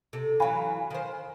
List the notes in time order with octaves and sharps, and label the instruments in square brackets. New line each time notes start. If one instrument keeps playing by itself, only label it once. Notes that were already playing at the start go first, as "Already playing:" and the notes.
[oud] C3 A4
[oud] E3 F#3 [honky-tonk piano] F5 G#5 B5
[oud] D#3 C5